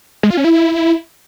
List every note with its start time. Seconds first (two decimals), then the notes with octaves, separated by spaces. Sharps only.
0.23 G#3
0.30 F4
0.37 C#4
0.44 E4